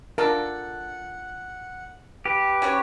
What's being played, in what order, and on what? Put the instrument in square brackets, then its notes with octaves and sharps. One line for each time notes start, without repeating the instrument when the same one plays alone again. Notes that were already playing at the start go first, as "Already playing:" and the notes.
[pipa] D4 F4 A4 [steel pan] A#4 [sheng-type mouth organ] F#5
[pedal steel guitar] G4 [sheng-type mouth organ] B4
[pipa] C#4 F#4 C#5